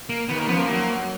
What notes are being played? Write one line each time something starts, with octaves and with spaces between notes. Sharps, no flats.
A#3
D#2 D#3 B3
A#3
F2 F3 B3
A#3
F#2 F#3